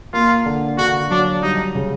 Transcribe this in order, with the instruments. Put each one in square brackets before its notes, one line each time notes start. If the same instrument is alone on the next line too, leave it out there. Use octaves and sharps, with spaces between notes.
[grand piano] A#3 [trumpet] F4
[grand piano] D3
[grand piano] D3 [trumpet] F#4
[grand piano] F#3 [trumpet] D4
[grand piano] G3 [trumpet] D#4
[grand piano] C#3